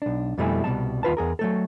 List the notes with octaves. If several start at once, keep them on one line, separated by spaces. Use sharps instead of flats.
B1 D4
F2 B2 G3 A3 E4 G#5
C2 B2 G3 G#3 A5
D#2 F4 B4 A5
E2 G#4 A#4
F#3 A3 A4